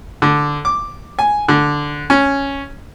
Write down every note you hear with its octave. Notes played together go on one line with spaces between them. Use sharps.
D3
D6
G#5
D3
C#4